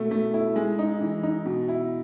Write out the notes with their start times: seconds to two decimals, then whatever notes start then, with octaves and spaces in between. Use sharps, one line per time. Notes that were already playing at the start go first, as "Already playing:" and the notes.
Already playing: B2 A3
0.11 A3
0.34 E4
0.56 G#3
0.79 D#4
1.01 E3
1.23 D#4
1.46 B2
1.68 E4